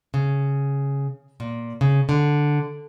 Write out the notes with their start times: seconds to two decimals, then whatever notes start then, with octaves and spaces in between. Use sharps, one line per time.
0.14 C#3
1.40 A#2
1.81 C#3
2.09 D3